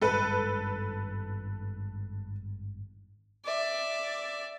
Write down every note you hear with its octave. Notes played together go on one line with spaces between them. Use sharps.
G#1 G2 G#3 A4 B4
D5 E5